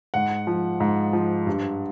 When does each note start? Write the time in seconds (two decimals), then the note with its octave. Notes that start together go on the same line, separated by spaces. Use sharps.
0.14 G#2 F#5
0.47 F3
0.80 G#2
1.13 F3
1.47 G2